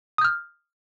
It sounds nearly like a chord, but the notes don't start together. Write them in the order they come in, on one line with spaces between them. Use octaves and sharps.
D#6 G6 F6